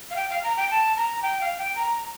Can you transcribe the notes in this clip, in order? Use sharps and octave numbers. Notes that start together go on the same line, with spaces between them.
F5
G5
F5
A#5
G5
A5
A#5
G5
F5
G5
A#5